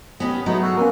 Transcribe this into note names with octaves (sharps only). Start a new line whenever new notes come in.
B3 C#4 G4 D#5
F#3 G#3 A3 B3 D#4 D#5
F#4 A4 F#5
A#3 B3 C#4 A#4 B4 F5 G#5